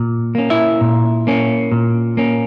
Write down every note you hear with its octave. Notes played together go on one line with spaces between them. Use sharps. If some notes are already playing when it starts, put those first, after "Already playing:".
Already playing: A#2
A#3 C#4
E4 E5
A#2
A#3 C#4
A#2
A#3 C#4